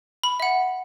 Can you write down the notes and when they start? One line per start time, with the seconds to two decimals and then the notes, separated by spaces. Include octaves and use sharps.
0.24 B5
0.40 E5 F#5